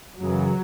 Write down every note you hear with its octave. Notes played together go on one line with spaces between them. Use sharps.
F#2 C#3 E3 F#3